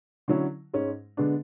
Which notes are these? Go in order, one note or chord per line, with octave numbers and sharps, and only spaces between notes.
D3 F#3 C#4 E4
G#2 G#3 C#4
D3 G#3 B3 D4